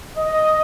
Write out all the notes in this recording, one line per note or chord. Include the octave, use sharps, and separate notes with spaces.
D#5